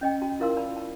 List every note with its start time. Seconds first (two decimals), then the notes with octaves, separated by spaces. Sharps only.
0.01 C#4 D#5 G5
0.22 F#4 A5
0.40 E4 F4 A#4 F5 C6 E6
0.57 D5 A5 B5
0.77 A5